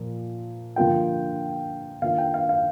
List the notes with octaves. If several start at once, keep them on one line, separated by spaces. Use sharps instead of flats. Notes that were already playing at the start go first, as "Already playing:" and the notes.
Already playing: A#2 F3 A#3
D3 F3 A#3 F4 G5
D#3 A#3 D4 F4 F5
G5
F5
F5